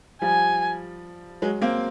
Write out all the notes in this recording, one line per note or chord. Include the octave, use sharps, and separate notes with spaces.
F3 G3 G#5
F#3 G#3
A#3 C4